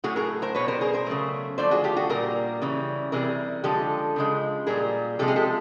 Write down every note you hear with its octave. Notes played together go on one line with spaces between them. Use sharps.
A2 F#3 A3 F#4 G#4
G#4 A#4
A#4 C5
B2 G3 B4 C#5
A#4 C5
G#4 A#4
A#4 C5
C#3 F#3 A3
D3 F3 A3 C5 D5
F#4 G#4
F4 G4
F#4 G#4
A#2 G3 G#4 A#4
C#3 E3 G3
C3 E3 G3 G#4 A#4
D3 F3 G#3 G4 A4
C#3 F3 G#3
A#2 G3 G#4 A#4
C3 F3 G#3 G4 A4
G#4
G4 A4